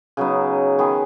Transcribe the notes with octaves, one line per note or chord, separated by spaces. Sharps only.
C#3 F#3 B3 D#4
D#3 B3 G#4